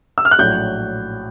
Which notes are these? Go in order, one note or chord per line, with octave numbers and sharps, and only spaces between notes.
E6
F6
F#6
A#1 A2 F#3 G6